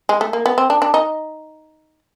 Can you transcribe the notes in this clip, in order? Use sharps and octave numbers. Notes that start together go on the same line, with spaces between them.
G#3
A3
A#3
B3
C4
D4
D4
D#4